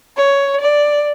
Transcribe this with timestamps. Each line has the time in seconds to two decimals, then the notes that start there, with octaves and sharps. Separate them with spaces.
0.17 C#5
0.61 D5